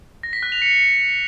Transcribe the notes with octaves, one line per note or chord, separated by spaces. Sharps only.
A#6
B6
F#6
F7
C#7